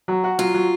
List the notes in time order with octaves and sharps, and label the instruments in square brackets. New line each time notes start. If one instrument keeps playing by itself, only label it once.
[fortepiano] F#3
F#4
[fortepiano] F#3 [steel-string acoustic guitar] F4
[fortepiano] F#3